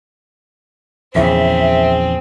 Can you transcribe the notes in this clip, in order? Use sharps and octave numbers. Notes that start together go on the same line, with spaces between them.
A#1 E2 C#3 C4 G#4 E5